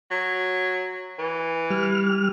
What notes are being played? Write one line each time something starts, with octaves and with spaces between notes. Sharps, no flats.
F#3
E3
G3 F6